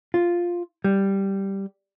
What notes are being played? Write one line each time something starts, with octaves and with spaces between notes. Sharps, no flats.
F4
G3